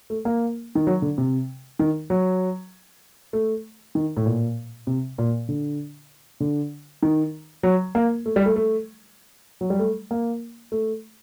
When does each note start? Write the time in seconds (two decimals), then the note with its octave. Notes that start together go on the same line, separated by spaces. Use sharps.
0.10 A3
0.25 A#3
0.75 D#3
0.87 F#3
1.02 D3
1.18 C3
1.79 D#3
2.10 F#3
3.33 A3
3.95 D#3
4.17 A2
4.26 A#2
4.87 C3
5.18 A#2
5.49 D3
6.40 D3
7.02 D#3
7.63 F#3
7.95 A#3
8.26 A3
8.36 G3
8.46 A3
8.56 A3
9.61 F#3
9.70 G3
9.79 A3
10.11 A#3
10.72 A3